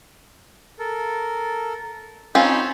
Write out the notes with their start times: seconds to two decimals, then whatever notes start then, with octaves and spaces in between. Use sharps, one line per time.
0.79 A4 A#4
2.35 C4 C#4 D#4 F4 B5 G6